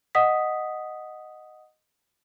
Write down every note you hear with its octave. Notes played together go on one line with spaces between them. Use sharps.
D#5 F#5 D#6 B6